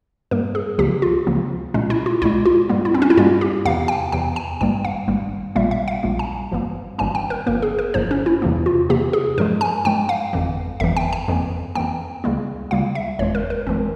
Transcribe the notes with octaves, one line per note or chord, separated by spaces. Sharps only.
G2 G3 A#3 A#4
G#4
C#2 C#3 F3 A#3 G4
F4
C#2 C#3 F3 A#3
C2 A#2 G#3 C#4
E4
F4
C2 A#2 G#3 E4
F4
G2 G3 A#3
E4
C4
C#4
E4
G2 G3 A#3 F4
G4
E2 C3 E3 F5
G5
E2 C3 E3 G5
G#5
G#1 G2 G3 A#3 G5
F5
G#1 G2 G3 A#3
A#1 A#2 G3 A#3 E5
E5
F5
A#1 A#2 G3 A#3
G#5
G#1 G2 E3 G3 A#3
G#1 G2 E3 G3 A#3 G#5
G5
A#4
G1 G2 F3 A#3 A#4
G#4
A#4
G1 G2 F3 A#3 C5
C#4
E4
E2 C3 E3 A#3
F4
E2 C3 E3 A#3 G4
G#4
G2 F3 G#3 A#4
G#5
G2 F3 G#3 G5
F5
G1 F2 E3
G1 F2 E3 E5
G5
G#5
F2 E3 A#3
F2 E3 A#3 G5
C#2 C#3 G3 A#3
C#2 C#3 G3 A#3 F5
E5
G1 F2 E3 G#3 C#5
A#4
A#4
G1 F2 E3 G#3 C4